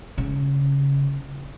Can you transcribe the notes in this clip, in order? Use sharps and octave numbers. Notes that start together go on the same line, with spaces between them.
C#3